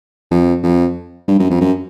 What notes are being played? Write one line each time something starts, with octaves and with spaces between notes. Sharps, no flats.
F2
F2
G2
F#2
F2
F#2